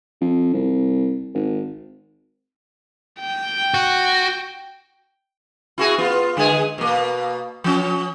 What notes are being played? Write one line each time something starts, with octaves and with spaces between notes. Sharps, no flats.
F2
C2
G#1
G5
F#4
E4 F#4 G#4
B3 F4
D3 G#3 G#4
B2 A#3
F3 C#4